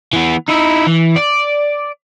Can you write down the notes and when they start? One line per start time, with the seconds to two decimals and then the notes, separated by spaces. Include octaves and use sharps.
0.13 E3 B3
0.49 D#4 E4
0.87 E3
1.16 D5